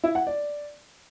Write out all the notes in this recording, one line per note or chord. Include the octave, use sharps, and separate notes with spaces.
E4
F#5
D5